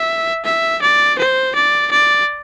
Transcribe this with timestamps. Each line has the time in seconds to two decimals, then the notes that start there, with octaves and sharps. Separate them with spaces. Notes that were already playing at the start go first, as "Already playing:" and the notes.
Already playing: E5
0.45 E5
0.82 D5
1.19 C5
1.55 D5
1.91 D5